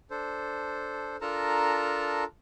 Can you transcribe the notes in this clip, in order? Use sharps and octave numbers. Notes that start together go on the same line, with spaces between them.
D4 A4 C5
D4 F4 A4 A#4 A5 A#5